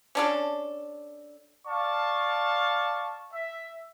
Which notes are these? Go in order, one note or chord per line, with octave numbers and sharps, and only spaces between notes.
C#4 D4 A4
D5 F5 A5 C#6
E5